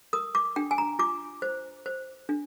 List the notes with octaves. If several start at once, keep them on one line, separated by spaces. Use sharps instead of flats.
A#4 D#6
D6
D4 G5
G#5
A#5
F4 D6
C5
C5
D4